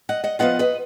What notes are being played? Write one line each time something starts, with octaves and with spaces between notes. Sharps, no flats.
D#5 F#5
D#5 F#5
F3 B3 F4 D#5 F#5
B4 D#5